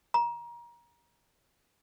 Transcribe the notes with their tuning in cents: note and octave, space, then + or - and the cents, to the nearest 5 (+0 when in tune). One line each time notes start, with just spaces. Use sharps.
A#5 +25